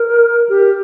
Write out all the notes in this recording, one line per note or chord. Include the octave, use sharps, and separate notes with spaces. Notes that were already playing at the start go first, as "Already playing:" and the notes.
Already playing: A#4
G4